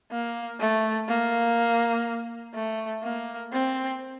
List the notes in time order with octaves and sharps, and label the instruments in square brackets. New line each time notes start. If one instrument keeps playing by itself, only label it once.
[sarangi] A#3
A3
A#3
A3
A#3
C4